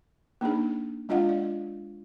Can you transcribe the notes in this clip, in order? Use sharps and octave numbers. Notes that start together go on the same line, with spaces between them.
A#3 D4 D#4 G#4
G#3 D4 F4 D#5 F5 F#5
D5